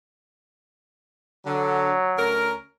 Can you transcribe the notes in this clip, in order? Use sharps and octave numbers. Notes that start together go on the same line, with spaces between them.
D3 F#3
D2 C#4 A#4